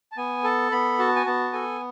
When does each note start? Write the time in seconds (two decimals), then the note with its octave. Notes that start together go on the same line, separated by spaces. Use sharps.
0.12 A5
0.17 B3 G#5
0.44 A4 A5
0.72 B3 B5
0.99 F#4 A5
1.16 G#5
1.26 B3 A5
1.53 A4 G#5